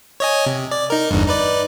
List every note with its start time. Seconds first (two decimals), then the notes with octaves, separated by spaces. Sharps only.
0.20 C#5 D#5 G#5
0.46 C3
0.71 D5
0.90 D#4 A#4
1.10 G1 E2 G2
1.27 D#4 B4 D5